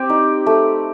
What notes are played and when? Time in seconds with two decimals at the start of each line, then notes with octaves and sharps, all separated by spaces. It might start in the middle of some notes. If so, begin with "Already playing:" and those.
Already playing: C4 G4
0.10 D#4
0.46 A3